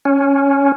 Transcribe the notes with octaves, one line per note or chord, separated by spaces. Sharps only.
C#4